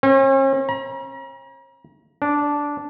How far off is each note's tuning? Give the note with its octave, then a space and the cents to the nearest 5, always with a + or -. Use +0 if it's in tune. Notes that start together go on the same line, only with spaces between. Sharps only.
C#4 -45
A#5 +40
D4 -10